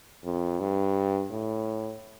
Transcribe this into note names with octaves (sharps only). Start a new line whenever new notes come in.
F2
G2
A2